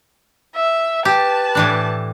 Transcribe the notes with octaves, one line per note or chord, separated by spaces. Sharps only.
E5
G4 B4 A5
A2 E3 D4